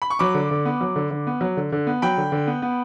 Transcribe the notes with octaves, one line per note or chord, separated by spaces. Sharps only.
B5
C#6
F#3 B5 D6
D3
D3
B3
F#3
D3
D3
B3
F#3
D3
D3
B3
F#3 G5 B5
D3
D3
B3
B3